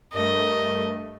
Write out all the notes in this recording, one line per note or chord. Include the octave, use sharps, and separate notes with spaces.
G2 A3 A#4 D#5